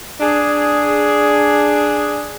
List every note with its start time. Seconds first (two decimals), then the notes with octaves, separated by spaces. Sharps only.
0.20 D4 G#4